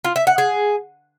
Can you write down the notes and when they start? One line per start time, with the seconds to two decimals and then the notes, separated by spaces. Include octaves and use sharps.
0.04 F4
0.16 E5
0.27 F#5
0.38 G#4